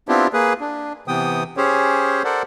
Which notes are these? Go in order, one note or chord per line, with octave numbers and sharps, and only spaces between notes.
B3 C4 D4 E4 F4 G4
A#3 G#4 B4
D4
C3 E3 B3 G5 D#6
C#4 G4 G#4 C5 C#5
A4 A#4 C5 D5 F#5